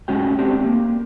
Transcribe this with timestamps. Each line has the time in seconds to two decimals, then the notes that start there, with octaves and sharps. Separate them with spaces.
0.08 G#3 A3 C#4 F#4 G5
0.39 A3 C4 D4 G4
0.65 A#3